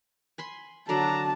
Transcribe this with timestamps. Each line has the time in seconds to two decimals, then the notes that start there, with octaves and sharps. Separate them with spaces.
0.38 G#5 B5 C6
0.89 D3 F#3 D4 A5 A#5